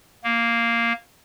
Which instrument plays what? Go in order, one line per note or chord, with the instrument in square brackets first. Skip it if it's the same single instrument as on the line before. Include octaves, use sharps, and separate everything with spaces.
[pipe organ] A#3